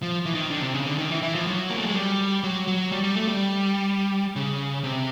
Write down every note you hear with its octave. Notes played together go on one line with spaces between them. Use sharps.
F3
E3
D#3
D3
C3
C#3
D3
D#3
E3
E3
F3
F#3
A#3
A3
G#3
G3
F#3
F#3
G3
G3
A3
G3
C#3
C3